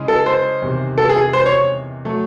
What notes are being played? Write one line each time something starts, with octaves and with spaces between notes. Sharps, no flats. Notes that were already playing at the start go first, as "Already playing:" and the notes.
Already playing: C#3 G#3 C#4 E4
A4
C5
E2 C3 D#3
A4
G#4
C5
C#5
F#3 A3